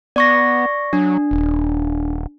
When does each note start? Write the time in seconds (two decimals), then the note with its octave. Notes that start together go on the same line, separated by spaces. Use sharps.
0.16 B3 D5 C#6 A#6
0.93 F#3 D4
1.31 D#1